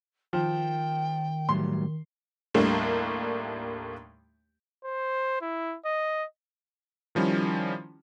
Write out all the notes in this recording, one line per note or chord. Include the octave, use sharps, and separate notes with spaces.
D#3 F3 G5
A2 F#3 G3 C6
D#2 A2 G3 A3 A#3 D4
C5
E4
D#5
D#3 F3 G3 C#4 E4